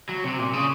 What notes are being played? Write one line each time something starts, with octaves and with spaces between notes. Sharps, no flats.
F#3
C3
A#2
C#3